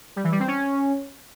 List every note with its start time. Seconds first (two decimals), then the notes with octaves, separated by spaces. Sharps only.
0.16 G3
0.24 E3
0.32 G3
0.40 C4
0.48 C#4